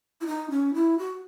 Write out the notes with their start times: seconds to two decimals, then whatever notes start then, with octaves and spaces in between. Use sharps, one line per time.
0.21 E4
0.27 D#4
0.50 C#4
0.74 E4
0.98 F#4